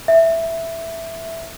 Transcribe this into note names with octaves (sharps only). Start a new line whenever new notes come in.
E5